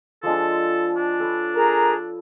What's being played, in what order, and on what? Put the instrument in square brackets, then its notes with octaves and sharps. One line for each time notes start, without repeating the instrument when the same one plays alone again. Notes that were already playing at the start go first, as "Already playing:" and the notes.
[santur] F3 G#3 D4 [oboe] A4
[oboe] D4
[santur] A4 B4 C#5
[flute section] G#4 A#4 A#5